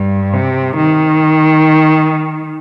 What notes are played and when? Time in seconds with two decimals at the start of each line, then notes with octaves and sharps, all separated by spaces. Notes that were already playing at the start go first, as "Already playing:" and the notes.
Already playing: G2
0.33 C3
0.77 D#3